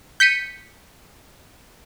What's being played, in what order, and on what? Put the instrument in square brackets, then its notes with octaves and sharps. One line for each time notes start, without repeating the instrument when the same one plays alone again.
[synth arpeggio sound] G6 B6 C#7 D#7